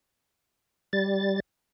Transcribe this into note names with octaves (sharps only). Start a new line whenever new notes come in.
G3 A6